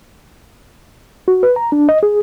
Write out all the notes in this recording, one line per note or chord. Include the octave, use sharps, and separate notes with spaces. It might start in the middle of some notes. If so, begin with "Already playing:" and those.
F#4
B4
A#5
D4
D#5
G#4